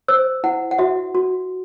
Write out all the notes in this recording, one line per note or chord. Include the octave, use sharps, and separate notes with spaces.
C5 E6
E4 F#5
F#5
F#4 E5
F#4